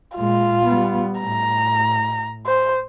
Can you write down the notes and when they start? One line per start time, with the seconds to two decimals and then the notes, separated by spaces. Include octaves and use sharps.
0.17 A#2 G#3 F4
0.64 G3 B3
1.21 A2 A#5
2.46 C5